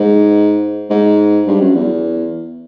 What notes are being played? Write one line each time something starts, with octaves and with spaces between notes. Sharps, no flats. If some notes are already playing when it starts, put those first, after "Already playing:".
Already playing: G#2
G#2
G2
F#2
E2